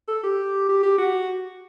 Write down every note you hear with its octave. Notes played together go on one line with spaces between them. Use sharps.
A4
G4
G4
G4
F#4